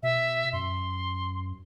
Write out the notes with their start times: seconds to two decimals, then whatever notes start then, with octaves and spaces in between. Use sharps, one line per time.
0.03 B2 E5
0.53 F#2 C6